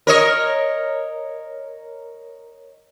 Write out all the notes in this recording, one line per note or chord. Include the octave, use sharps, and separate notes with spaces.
A#4 C#5 D#5